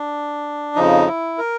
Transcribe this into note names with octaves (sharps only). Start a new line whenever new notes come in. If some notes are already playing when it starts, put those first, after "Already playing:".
Already playing: D4
F2 C#3 F3 D#4
E4
A#4